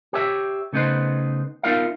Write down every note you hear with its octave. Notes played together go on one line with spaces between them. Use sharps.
G4 C#5 E5
C#3 A3 B3 D#4 B4 C5
B3 D#4 F4 A#4 E5 F5